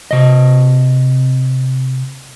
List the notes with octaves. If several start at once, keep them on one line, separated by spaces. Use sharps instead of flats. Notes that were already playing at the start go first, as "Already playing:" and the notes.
C3 D#5